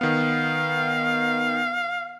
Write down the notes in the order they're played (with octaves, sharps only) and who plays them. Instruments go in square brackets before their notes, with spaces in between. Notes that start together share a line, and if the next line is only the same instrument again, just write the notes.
[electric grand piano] D#3 B3 [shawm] F5